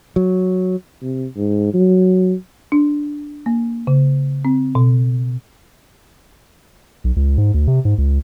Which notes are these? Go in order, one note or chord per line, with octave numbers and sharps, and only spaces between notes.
F#3
C3
G#2
F#3
D4
A#3
C#3
C4
B2
B1
C#2
G#2
D2
C3
G#2
C#2